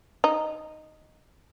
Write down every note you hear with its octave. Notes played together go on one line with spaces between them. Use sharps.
D#4